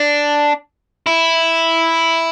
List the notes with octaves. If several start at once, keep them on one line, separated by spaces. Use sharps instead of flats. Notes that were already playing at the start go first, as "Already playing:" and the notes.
Already playing: D4
E4